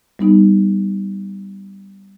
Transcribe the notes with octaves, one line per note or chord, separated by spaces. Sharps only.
G3 B3 D#4